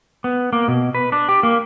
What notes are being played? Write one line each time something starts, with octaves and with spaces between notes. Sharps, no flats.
B3
A#3
B2
B4
D4
G4
A#3